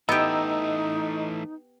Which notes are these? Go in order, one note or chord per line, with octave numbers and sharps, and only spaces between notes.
E3 A3 B3 D#4 G4 D#5 A#5 E6